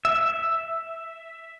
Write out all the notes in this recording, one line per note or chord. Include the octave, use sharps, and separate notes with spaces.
E5